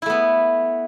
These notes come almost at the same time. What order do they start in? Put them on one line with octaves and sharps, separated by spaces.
E4 A3 B3